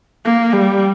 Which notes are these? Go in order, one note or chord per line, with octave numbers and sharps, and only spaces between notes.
A#3
G3